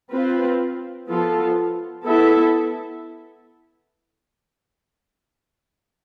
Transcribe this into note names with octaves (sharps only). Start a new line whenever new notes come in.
C4 F4 B4
F3 B3 F4 A4
B3 E4 A4 E5